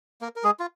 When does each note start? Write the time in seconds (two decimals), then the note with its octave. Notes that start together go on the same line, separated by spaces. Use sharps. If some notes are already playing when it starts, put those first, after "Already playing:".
0.21 A#3 A#4
0.36 A#4
0.44 G#3 G#4
0.59 F4